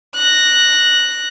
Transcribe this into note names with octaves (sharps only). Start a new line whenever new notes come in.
F#6 A#6